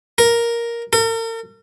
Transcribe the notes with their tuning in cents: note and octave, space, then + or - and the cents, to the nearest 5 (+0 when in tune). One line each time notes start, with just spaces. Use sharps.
A#4 +5
A#4 -45